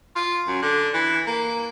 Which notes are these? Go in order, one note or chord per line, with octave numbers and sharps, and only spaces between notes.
F4
F#2
D3
E3
A#3